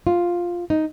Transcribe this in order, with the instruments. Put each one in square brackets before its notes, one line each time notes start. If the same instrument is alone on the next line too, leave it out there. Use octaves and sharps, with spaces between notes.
[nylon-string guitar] F4
D#4